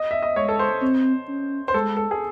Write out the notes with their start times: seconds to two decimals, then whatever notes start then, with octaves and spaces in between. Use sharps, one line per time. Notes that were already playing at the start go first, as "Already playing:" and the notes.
Already playing: D#5
0.11 E5
0.22 D#5
0.36 G#3 C#5
0.49 A4
0.59 C5
0.82 C4
1.28 C#4
1.68 C5
1.74 G#3 A4
1.97 A4
2.11 G#4